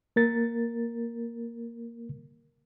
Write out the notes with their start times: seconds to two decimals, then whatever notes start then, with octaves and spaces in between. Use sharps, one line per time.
0.16 A#3 A#4 A6